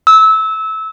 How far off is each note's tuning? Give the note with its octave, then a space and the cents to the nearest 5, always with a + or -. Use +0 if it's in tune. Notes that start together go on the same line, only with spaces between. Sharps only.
E6 -20